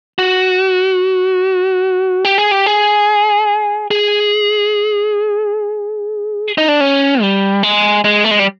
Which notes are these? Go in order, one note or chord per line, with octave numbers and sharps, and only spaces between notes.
F#4
G4
G#4
G4
G#4
G#4
D#4
D4
C#4
G3
G#3
G#3
A3
G#3
G3